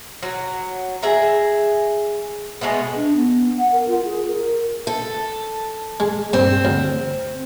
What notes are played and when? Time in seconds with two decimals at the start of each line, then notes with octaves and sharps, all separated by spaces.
0.23 F#3
1.03 G#4 E5 A#5
2.61 B2 G#3 A3 B3
2.96 D4
3.17 B3
3.59 F#5
3.72 A#4
3.88 F4
4.05 G#4
4.27 A#4
4.87 A4
6.00 G#3
6.33 G2 C4
6.65 D2